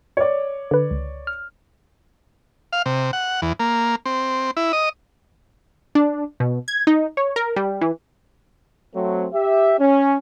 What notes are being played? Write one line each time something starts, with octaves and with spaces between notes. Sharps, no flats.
C#5 D5
D3 B4
C#2
F6
F5
C3
F#5
E2
A#3
C4
E4
D#5
D4
B2
G#6
D#4
C#5
A#4
G3
E3
F#3 A3 C4
G4 E5
C#4